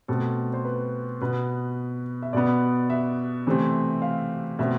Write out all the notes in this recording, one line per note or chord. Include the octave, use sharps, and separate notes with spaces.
B2 A3 C4 A4
C5
B4
B2 B3 B4
E5
B2 B3 D5
E5
C3 E3 A3 C4
F5
B2 A3 C4 E5